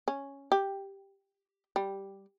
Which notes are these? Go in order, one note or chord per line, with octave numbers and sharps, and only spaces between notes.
C#4
G4
G3